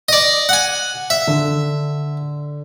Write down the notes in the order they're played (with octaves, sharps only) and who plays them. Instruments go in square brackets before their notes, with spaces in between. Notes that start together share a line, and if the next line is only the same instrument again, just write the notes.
[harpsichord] D5 D#5
F#5 G#5
E5
[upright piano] D3